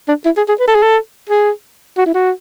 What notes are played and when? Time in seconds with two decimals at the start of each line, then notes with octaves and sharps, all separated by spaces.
0.08 D4
0.25 E4
0.37 G#4
0.49 G#4
0.60 B4
0.68 A4
0.75 G#4
0.83 A4
1.29 G#4
1.98 F#4
2.06 E4
2.14 F#4